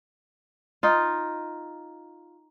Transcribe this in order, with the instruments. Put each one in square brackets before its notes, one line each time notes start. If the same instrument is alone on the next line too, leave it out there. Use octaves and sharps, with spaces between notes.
[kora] D#4 F4